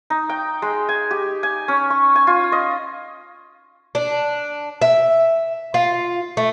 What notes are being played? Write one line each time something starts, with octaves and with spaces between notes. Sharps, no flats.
D#4
G5
G#3
G#5
G4
G#5
C#4
C#6
G#5
F4
D#5
D4
E5
F4
A3